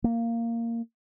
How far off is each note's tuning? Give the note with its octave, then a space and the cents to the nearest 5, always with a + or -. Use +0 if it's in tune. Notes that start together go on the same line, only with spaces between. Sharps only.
A#3 -10